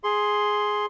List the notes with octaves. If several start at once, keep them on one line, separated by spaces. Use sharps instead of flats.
G#4 C6